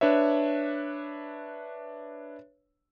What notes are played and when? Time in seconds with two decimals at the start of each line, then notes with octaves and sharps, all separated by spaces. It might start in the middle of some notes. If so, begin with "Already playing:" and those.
0.01 D4 B4 C#5 E5